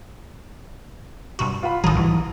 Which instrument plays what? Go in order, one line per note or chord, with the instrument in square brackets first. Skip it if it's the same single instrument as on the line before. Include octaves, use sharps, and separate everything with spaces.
[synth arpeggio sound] G2 C3 F#4
[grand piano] F4 F#5 B5
[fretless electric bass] A1 D#3 F#3 [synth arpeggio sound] G#4 A4 [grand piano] A#5 D#6
[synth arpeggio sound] C2 G#2 [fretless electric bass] E3